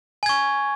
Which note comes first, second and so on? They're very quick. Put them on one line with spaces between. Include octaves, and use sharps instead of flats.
G#5 G#6 C#6